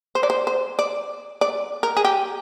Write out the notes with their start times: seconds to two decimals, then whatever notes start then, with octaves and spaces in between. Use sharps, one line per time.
0.15 C5
0.23 D5
0.30 C5
0.47 C5
0.79 D5
1.41 D5
1.83 A#4
1.97 G#4
2.05 G4